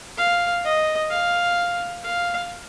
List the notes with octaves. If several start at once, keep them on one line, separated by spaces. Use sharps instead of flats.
F5
D#5
F5
F5